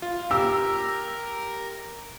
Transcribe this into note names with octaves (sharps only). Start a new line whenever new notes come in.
F4
G4 A#4 E6